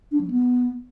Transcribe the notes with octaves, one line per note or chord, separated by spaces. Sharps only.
D4
F#3
B3